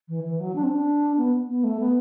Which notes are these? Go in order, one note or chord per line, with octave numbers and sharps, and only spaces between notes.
E3
E3
F#3
D4
C4
D4
B3
B3
A3
B3